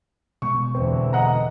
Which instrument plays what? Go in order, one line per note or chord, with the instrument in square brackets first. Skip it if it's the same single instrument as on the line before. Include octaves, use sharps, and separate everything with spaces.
[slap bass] B2 G#3 B3 [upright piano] C#6
[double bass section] E2 D3 E3 [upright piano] C4
[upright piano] D#5 F#5 A#5